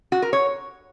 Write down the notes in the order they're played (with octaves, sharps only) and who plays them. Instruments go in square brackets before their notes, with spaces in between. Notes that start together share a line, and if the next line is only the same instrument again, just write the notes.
[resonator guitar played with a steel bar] F#4
A#4
C#5